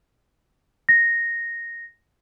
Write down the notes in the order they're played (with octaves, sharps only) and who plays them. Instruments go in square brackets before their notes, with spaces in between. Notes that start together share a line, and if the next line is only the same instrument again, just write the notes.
[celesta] A#6